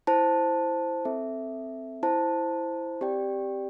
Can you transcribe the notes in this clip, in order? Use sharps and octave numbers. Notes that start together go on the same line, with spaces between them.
E4 C5 A5
C4 A4 E5
E4 C5 A5
C4 G4 D5 G5